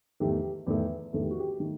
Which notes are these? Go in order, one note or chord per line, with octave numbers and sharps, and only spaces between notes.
E2 D#3 A3 G4
E2 D#3 A3
E2 D#3 A3 A4
G4
F#4
G4
D#3 A3